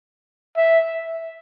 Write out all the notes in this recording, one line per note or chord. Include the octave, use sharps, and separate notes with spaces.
E5